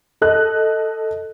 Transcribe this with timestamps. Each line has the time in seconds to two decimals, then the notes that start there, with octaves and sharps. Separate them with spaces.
0.21 A4 D#5 F#6